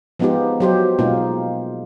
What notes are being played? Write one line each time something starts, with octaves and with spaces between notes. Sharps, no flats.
F3 G#3 B3 D#4 F4 G4
F#3 G4 C5
B2 G#3 A#3 D#4 F4